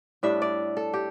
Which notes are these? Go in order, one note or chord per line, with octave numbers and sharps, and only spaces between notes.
A2 G3 D4 E5
D5
A4
G4